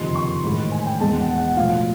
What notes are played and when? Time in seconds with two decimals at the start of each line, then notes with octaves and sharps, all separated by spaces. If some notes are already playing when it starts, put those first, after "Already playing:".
Already playing: F#1 F2 C3 D#3 C6
0.15 C#6
0.43 A1 G#2 D#3 B5
0.72 G#5
0.86 G5
1.00 E1 E2 B2 G#3 A5
1.19 F#5
1.38 F#5
1.57 B1 A2 F3 F5